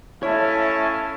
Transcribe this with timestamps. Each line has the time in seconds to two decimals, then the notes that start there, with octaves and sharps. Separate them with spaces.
0.23 A3 C#4 E4 C#5 F5 A5